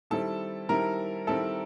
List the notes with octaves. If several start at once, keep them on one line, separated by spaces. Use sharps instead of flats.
D#3 G3 C4 E4 A4 A5
D#3 G3 C4 E4 A#4 A#5
D#3 G3 C4 E4 A4 A5